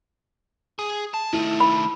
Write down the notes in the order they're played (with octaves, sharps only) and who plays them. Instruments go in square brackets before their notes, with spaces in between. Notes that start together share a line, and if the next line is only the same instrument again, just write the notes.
[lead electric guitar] G#4
A5
[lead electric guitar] D#3 A3 [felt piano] E4
[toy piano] B5